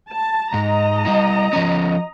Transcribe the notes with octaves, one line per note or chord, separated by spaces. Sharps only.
A5
G#2 D#5 A#5
G3 E4
F3 C#4